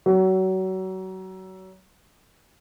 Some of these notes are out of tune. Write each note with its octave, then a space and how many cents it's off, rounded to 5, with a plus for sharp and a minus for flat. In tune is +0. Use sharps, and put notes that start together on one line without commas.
F#3 +30